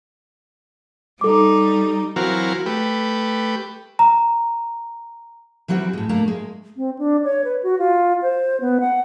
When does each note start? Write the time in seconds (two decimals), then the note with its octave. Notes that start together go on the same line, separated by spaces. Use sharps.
1.21 G3 D#4 A4 D6
2.16 E3 F#3 C4 F#4 A#4 F5
2.66 A3 G4 B4
3.99 A#5
5.68 E3 F#3 G3 C4 E4 F#4
5.93 A2 G#3
6.09 A3 A#3 D4 A#4
6.28 G#3
6.77 C4
6.98 D4
7.24 C#5
7.44 B4
7.63 F#4
7.79 F4
8.22 C5
8.61 B3
8.80 F#5